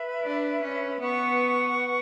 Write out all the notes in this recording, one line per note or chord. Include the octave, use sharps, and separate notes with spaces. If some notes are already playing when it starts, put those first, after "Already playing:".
Already playing: B4 E5 B5
D4
C#4
B3 B4 F#5 C#6